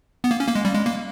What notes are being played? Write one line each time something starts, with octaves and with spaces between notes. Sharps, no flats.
B3
A#3
C#4
A#3
G#3
G3
G#3
A#3